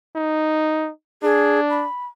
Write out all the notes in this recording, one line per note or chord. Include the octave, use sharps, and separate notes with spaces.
D#4
D4 G#4
B5